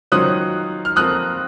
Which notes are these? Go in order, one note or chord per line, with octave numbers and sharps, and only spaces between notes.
D#3 F#3 C#4 F4 C5 D#6 F#6
F6
F3 C4 F4 A#4 D#6 F#6